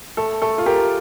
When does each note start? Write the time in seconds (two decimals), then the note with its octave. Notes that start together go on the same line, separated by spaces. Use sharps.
0.17 A3 A4
0.42 A3 A4
0.58 F4
0.66 G4 A#4